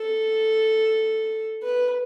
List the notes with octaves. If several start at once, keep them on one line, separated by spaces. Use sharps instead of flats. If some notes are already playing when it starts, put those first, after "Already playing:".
Already playing: A4
B4